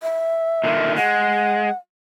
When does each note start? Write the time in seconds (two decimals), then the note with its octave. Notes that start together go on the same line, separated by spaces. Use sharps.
0.03 E5
0.64 A#2 D3 D#3
0.96 G#3 F#5